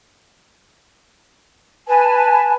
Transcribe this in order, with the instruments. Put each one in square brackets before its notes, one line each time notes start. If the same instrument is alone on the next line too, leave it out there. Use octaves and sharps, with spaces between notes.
[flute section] B4 G#5 A5